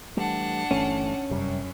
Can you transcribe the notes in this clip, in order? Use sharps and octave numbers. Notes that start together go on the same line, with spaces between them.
E3 G3 A3 D4 F#5
G1 E3 A3 C#4
F1 F#2 C3 G3